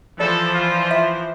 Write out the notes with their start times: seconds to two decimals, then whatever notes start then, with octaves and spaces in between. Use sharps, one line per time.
0.20 E3 F3 A4 C5 D5
0.54 F4
0.91 E5